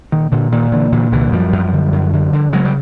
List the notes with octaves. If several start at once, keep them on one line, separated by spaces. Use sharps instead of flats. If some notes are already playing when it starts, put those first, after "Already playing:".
A#2 D#3
A#2 D3
A#2 D#3
A#2 D3 E3
A#2 D3 E3
C2 D3 E3
F#2 F3 G3
F#2
D3
F#2
D3
D3
C#3 F#3 G#3
G3